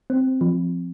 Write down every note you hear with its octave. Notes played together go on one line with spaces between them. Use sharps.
C4
F3